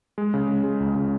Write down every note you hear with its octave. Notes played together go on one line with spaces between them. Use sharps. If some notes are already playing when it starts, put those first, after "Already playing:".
G#3
C#3
G#3
G#3
C#2
C#3